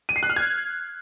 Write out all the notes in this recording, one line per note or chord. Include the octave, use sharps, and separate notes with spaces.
D#7
C7
F#6
F6
G#6